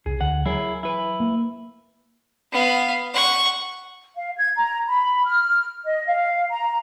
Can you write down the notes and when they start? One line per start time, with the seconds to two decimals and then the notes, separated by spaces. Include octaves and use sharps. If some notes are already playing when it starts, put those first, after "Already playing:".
0.06 C2 G#4
0.21 D2 F#5
0.46 F#3 E4 G#4 A#4
0.83 E4 B4
1.20 A#3
2.52 B3 F5
3.13 F#5 C#6
4.17 F5
4.37 G#6
4.57 A#5
4.87 B5
5.25 F6
5.85 D#5
6.06 F5
6.50 A#5